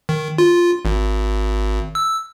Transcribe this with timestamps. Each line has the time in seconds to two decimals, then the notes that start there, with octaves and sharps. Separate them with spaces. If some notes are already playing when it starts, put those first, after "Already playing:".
0.09 D#3
0.38 F4
0.85 G#1
1.95 E6